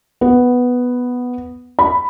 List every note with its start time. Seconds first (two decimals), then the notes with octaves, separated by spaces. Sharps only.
0.21 B3
1.79 B5